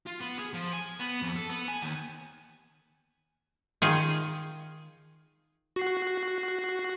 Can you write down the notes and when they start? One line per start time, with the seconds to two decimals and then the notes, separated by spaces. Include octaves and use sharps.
0.06 F4
0.20 B3
0.39 G#4
0.54 F3
0.73 G#5
1.00 B3
1.22 F2
1.36 A4
1.49 B3
1.68 G#5
1.82 D#2
3.82 D#3 F4 G#4
5.76 F#4 C7